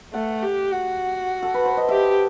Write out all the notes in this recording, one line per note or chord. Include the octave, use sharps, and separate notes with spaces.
A3 F#5
G4
F#4
A4
B4
C5
D#5
G4 E5